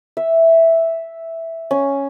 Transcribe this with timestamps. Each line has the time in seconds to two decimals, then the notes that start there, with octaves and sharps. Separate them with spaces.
0.17 E5
1.71 C#4